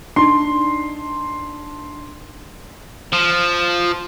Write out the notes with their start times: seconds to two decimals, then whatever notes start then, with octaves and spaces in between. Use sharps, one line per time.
0.16 D4 D#4 C6
3.12 F3